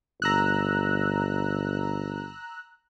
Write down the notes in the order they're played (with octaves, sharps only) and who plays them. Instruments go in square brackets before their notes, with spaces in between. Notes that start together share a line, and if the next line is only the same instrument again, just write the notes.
[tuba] G1 [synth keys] A#5 E6 F#6